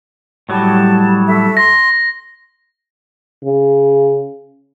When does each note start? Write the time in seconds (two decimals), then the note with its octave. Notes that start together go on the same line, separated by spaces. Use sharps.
0.49 A2 F#3 G3 A5
1.27 A4 E5
1.57 C6 A#6
3.44 C#3